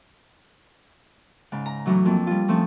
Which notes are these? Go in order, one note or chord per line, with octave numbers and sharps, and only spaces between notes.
G#2 C#3
A#5
A2 E3 F#3 D4
F2 A#3 C4
G3 F4
F3 A3 C4 C#4